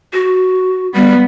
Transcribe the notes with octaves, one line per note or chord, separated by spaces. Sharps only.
F#4
G3 B3